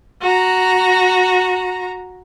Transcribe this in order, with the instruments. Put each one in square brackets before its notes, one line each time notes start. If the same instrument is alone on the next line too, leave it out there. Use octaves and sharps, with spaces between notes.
[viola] F#4 A#5